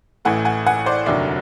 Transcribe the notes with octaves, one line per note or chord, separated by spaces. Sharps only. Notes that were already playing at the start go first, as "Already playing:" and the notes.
A1 A2 E3 A3 F#5 G#5
F#5 G#5
F#5 G#5
C5 D5
F1 D#2 D3 F#3 D5 E5